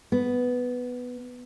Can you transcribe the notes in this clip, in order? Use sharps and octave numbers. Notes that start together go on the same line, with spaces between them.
B3